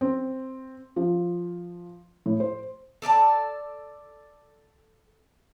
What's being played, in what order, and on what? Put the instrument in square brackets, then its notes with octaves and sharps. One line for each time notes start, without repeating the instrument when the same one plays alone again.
[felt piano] C4
F3
A2
C5
[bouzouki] A4 D5 E5 A5